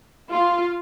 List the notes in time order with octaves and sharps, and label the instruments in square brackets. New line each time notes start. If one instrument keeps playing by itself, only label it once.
[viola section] F4